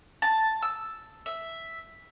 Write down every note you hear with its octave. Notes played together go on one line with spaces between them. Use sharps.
A5
E6
E5